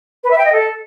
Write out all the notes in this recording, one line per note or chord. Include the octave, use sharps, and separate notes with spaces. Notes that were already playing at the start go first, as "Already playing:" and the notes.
B4
E5
G5
D#5
A4